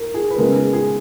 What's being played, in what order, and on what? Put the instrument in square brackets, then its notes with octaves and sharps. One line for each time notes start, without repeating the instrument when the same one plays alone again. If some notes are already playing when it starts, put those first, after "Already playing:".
Already playing: [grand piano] A#4
G#4
B4
C#3 G#3 B3 A#4
G#4
G#4